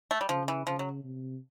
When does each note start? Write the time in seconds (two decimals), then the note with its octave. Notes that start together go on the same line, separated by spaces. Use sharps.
0.11 A3
0.21 G3
0.29 C#3 F3
0.48 E3
0.66 C#3 F3
0.79 F#3
1.04 C3